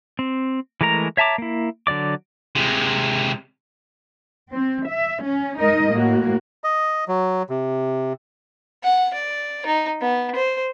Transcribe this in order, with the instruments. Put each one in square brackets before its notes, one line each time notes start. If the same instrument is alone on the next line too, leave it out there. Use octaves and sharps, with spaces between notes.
[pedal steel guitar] C4
E3 G#3 A3 A#4 A#5
C#5 E5 A5 A#5 D6
A#3 E4
D3 F#3 D5 D6
[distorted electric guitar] C3 G#3
[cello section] C4
E5
C#4
G#3 D#4 A#4 D#5
A2 A#3 F#4
[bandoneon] D#5
F#3
C3
[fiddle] F#5
D5
D#4
B3
C5